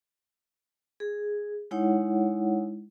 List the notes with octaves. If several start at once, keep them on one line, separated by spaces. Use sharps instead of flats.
G#4
G#3 D#4 E4 C#5 F#5